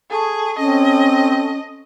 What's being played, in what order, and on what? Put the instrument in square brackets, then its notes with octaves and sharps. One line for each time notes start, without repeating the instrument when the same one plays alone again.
[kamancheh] G#4 [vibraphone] A4 A5 C#6
[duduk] C4 [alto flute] C#4 [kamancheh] D#5